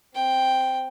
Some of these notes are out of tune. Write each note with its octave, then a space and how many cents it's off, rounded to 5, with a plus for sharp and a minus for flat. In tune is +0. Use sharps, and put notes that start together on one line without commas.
C4 +0 G5 +0